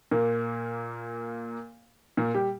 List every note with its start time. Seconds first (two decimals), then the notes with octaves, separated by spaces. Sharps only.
0.11 A#2 A#3
2.17 A#2 A#3
2.34 G3 G4